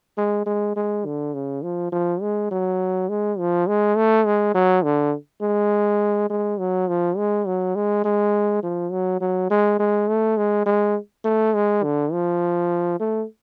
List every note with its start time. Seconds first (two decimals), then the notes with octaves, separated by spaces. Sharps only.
0.18 G#3
0.46 G#3
0.76 G#3
1.06 D3
1.34 C#3
1.63 F3
1.92 F3
2.22 G#3
2.51 F#3
3.09 G#3
3.39 F3
3.67 G#3
3.97 A3
4.26 G#3
4.54 F#3
4.84 D3
5.42 G#3
6.30 G#3
6.58 F#3
6.88 F3
7.17 G#3
7.47 F#3
7.75 G#3
8.04 G#3
8.63 F3
8.92 F#3
9.21 F#3
9.51 G#3
9.79 G#3
10.08 A3
10.37 G#3
10.66 G#3
11.25 A3
11.54 G#3
11.84 D3
12.12 F3
13.00 A3